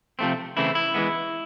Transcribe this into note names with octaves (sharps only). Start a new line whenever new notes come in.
C3 F3 A3 C4
C#3 E3 A3 C4 E4
E4
E3 G#3 B3